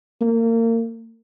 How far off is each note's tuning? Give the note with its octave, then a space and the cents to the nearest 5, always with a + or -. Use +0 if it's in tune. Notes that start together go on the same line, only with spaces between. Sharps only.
A#3 -30